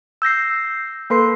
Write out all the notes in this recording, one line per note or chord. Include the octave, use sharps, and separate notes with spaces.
E6 G6 A#6 C7
A#3 A4 B4 C6 C7